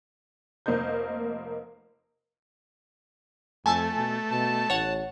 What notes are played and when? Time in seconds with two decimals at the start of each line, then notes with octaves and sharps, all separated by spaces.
0.66 F1 A#3 C5 D#5 G6
3.66 F2 A3 G#5 A5 E6
3.97 B2
4.31 B2 A5
4.70 A1 C#5 F#5 A6